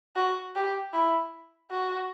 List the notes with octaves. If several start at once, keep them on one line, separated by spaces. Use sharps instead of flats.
F#4
G4
E4
F#4